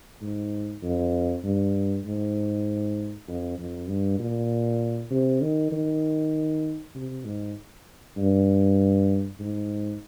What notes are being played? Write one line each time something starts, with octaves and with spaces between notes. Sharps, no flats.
G#2
F2
G2
G#2
F2
F2
G2
A#2
C3
D#3
D#3
C3
G#2
G2
G#2